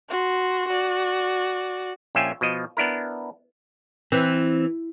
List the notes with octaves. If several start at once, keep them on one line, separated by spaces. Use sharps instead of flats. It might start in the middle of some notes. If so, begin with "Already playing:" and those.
F#4 C6
F#4 D5
A#1 C#4 F4 E5 G5 G#5
B2 F3 D#5
B3 D4 E4 A#4
E3 C4